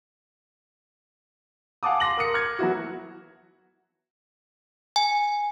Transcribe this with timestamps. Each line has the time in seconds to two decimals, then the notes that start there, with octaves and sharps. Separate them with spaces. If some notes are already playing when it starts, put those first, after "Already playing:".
1.83 F5 F#5 G#5 A5 D6 D#6
2.00 C6 D6 A#6 F#7
2.17 A#4 D#6 C#7
2.33 D6 F6 G#6
2.59 F#3 B3 E4 F#4
4.96 G#5